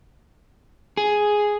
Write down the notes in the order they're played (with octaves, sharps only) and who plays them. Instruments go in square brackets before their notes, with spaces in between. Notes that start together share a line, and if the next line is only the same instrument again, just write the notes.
[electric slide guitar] G#4